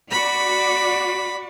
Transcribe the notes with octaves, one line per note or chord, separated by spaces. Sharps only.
F#4 D5 B5